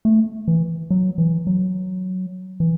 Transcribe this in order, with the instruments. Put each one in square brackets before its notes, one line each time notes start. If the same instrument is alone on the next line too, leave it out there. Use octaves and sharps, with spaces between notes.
[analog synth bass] A3
E3
F#3
E3
F#3
E3